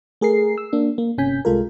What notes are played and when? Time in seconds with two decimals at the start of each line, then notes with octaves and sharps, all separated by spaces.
0.21 A3 G#4 A#4 C7
0.58 E6
0.73 A#3 D4
0.98 A#3
1.18 G1 C3 C#4 G#5 G6 B6
1.45 C2 G#3 F4 A4 A#4